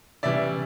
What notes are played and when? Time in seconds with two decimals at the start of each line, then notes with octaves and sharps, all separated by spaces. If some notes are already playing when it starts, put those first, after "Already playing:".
0.23 C#3 E3 G3 D5 E5